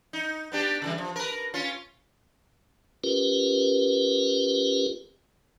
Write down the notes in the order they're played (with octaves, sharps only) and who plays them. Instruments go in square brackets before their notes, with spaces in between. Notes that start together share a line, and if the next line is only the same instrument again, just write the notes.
[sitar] D#4
B3 D4 G4
C#3 E3 G3
F3
A#4 B4
C#4 F4
[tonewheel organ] C#4 F4 G4 A#4 B4